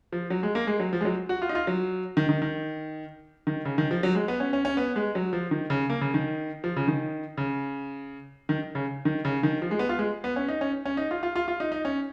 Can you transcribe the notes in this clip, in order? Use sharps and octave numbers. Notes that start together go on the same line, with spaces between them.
F3
F#3
G#3
A#3
G#3
F#3
F3
G#3
F#3
F#4
F4
D#4
F4
F#3
D#3
D#3
D#3
D#3
C#3
D#3
F3
F#3
G#3
B3
C#4
C#4
C#4
B3
G#3
F#3
F3
D#3
C#3
A#3
C#3
D#3
F3
C#3
D#3
C#3
D#3
C#3
D#3
C#3
D#3
F3
G#3
B3
F4
G#3
B3
C#4
D#4
C#4
C#4
D#4
F4
F4
F4
F4
D#4
D#4
C#4